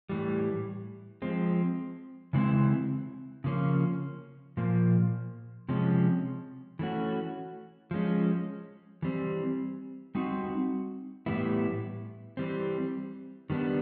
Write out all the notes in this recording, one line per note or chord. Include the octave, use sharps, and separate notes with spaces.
A2 E3 G3
F3 G#3 C4
C#3 E3 G#3 C4 E4
C#3 F3 A#3 C#4
A#2 F3 A#3
C3 F3 G#3 C#4
E3 A3 C#4 F#4
F3 G#3 C#4
E3 G3 C4
G3 C4 D#4 F#4
A2 E3 G3 B3 E4
E3 G3 C4
D#3 G3 B3 D4